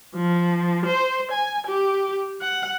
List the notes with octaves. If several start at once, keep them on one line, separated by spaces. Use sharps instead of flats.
F3
C5
G#5
G4
F#5